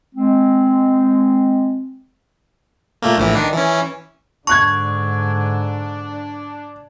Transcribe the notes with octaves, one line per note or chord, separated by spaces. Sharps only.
G#3 C4
A#2 A3 A#3
A#1 A2 E3
D#3 D4
E3 C#4
G#2 D3 D4 A5 C#6 F#6 G#6